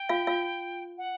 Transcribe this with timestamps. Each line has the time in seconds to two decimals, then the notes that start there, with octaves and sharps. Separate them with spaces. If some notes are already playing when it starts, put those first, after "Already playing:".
Already playing: G5
0.09 F4 F5
0.27 F4 F5
0.98 F#5